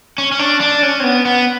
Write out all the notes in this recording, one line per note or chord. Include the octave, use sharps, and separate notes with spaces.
C#4
C#4
D4
D4
C#4
C4
B3
B3